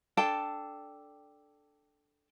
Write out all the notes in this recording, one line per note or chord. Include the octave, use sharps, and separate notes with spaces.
D4 A4 G5 A5